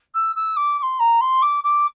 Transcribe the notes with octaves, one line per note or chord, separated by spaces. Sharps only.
E6
E6
D6
D6
C6
A#5
C6
D6
D6